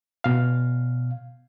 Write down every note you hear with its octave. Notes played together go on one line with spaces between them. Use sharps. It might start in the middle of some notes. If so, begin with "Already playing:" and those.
B2 F5